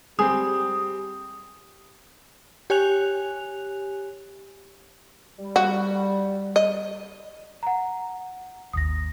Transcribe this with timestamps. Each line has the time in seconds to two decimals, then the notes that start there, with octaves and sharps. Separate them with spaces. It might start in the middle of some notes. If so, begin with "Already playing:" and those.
0.19 G3 C4 G4 G#4 D#6
2.70 G4 C#5 G#5 F#6 F7
5.38 G3
5.56 F#4
6.56 D#5
7.63 F#5 A#5
8.73 G#1 D#2 D#6 A#6